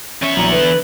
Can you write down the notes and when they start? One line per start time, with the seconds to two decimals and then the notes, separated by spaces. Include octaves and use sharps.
0.22 E2 C#4 E5 C#6
0.37 A#1 F#3 E4 A#5 F#7
0.52 D3 B4